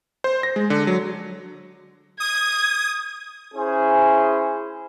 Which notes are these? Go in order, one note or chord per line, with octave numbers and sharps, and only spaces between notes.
C5
A#6
G#3
D3
F#3
D#6 G#6
C#4 E4 G#4 C5